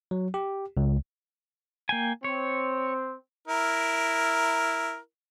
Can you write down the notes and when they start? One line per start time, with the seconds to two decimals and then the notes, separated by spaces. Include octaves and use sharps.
0.11 F#3
0.34 G4
0.77 C#2
1.89 A#3 G5 G#5
2.24 C4 C#5
3.47 E4 A#4